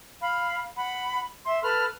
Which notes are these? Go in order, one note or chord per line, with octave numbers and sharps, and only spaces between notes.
F5 B5
F#5 B5
E5 C6
A4 B4 B5 F6